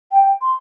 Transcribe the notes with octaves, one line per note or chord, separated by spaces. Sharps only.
G5
C6